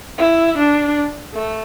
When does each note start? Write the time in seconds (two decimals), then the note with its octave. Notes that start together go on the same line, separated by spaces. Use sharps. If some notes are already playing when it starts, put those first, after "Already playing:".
0.18 E4
0.58 D4
1.35 A3